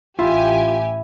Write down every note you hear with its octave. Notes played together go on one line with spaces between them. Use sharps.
A1 E4 F4 G4 G#5